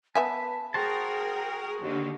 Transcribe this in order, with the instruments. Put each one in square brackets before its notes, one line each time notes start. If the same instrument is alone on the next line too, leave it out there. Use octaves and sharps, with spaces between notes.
[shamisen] B3 E5 G#5 [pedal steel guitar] B4 [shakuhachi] A5
[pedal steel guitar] F#4 C5 A5 [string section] G#4 A#4 [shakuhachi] G5
[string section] D#2 D3